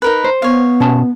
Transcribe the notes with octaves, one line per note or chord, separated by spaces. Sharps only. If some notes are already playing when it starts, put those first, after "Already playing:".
D#4 A#4 B4
C5
B3 C#5 F5
B2 C#4 A5